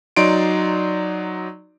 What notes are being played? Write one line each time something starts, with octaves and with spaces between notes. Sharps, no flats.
F#3 D#4 D5 C6 D7